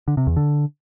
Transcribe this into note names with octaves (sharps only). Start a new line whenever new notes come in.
D3
C3
E2
D3